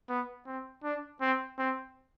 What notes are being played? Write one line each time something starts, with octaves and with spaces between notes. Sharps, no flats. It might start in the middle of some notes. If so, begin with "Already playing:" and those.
B3
C4
D4
C4
C4